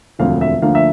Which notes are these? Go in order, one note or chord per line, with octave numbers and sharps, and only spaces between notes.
E1 D2 D3 F3 C4 F5
E5
D2 D3 F3 A#3 F5
E5